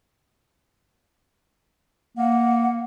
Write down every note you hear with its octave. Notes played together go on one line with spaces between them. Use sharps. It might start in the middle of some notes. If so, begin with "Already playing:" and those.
A#3 F#5